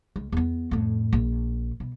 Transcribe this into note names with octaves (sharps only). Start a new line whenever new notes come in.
C#2
E2 B3
F2 A2
A#1
B2